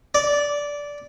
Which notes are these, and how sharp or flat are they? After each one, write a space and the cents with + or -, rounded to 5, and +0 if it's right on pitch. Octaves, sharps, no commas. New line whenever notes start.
D5 -15